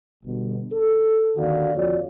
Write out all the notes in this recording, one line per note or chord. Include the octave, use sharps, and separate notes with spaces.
G1 B2
A4
D#2 D3 D#3 F#4 D5 F5
F2 F4 F#4 C#5 D5